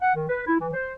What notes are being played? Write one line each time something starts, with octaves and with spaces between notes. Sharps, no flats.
F#5
D#3
B4
E4
E3
C5